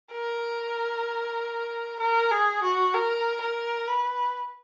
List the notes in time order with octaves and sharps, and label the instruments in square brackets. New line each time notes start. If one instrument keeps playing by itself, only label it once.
[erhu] A#4
A#4
G#4
F#4
A#4
A#4
B4